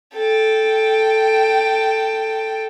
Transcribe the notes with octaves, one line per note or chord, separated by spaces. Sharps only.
A4 G5